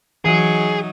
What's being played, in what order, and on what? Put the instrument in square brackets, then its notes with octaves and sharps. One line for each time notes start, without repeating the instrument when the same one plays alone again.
[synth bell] E3 E5 D7 [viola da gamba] F#3 D#4 [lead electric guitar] G#4